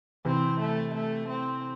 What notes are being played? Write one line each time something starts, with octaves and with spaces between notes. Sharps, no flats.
C3 E3 C4
A3
A3
C4